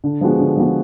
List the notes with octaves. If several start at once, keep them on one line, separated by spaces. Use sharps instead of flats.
D3
F3 G#3 B3 F#4
D3
F3 G#3 B3 F#4